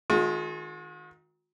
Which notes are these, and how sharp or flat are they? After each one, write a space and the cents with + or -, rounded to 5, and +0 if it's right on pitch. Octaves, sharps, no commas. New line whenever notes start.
D#3 +10 G#3 +35 F#4 -45